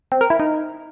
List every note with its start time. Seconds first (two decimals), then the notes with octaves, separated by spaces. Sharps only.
0.12 C4
0.21 A#4
0.30 E4
0.40 D#4